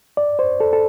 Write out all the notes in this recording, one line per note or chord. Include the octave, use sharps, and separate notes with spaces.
D5
C5
A4
A4